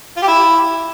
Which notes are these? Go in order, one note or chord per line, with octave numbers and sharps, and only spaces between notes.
F4
G4
E4